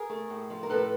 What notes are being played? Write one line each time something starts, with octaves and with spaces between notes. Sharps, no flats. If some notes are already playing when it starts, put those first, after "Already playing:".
Already playing: G#4 A#4
A3
A2
F3
A#4
A2 A4 B4